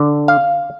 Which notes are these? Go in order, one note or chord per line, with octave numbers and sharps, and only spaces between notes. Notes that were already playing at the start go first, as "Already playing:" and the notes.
Already playing: D3
F5